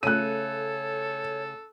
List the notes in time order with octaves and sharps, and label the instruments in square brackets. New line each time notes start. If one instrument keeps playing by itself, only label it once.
[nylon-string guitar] C#3 A3 [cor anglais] A4 [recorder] C#5 [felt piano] F#6 D#7